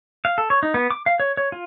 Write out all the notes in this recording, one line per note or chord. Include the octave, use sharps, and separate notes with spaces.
F5
A4
C#5
D#4
B3
D6
F5
C#5
C#5
F4